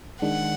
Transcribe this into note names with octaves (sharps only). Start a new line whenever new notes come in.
D#3 G#3 D4 F#5